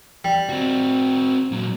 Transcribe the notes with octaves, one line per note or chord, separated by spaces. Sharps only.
G3
C4 F#4
A#2 F#3